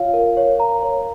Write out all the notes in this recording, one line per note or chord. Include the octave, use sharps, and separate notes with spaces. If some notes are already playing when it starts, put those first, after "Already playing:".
Already playing: F4 C#5 F5
A#4
C#5
A#5
C#5